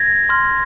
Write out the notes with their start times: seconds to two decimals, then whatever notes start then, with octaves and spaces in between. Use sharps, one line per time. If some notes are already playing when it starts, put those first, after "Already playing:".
Already playing: G#6 A#6
0.29 C6 F6